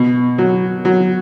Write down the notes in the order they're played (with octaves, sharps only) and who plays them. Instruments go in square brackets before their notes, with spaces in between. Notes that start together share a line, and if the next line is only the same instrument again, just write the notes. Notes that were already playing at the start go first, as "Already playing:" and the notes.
Already playing: [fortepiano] B2
F#3
F#3